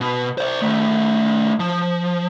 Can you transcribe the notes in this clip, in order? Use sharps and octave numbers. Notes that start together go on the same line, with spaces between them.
B2
C5 D5
D#3 A3
F3